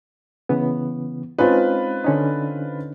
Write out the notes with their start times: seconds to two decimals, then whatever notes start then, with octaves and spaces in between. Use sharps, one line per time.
0.49 C#3 E3 B3
1.39 G#3 C4 C#4 D#4 F4 B4
2.04 D3 C#4 D#4